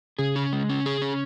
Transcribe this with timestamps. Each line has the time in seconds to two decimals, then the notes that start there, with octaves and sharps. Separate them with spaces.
0.19 C#3 G#4
0.36 C#4
0.53 G#3
0.69 C#4
0.86 G#4
1.02 C#4